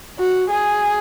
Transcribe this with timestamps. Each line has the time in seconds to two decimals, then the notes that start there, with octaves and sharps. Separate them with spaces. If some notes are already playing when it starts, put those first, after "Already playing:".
0.19 F#4
0.50 G#4